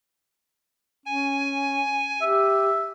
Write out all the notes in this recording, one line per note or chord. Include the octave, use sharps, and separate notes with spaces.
C#4 G#5
G4 E5